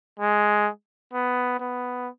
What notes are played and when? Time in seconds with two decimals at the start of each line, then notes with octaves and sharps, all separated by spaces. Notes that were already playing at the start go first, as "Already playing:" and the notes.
0.20 G#3
1.13 B3
1.60 B3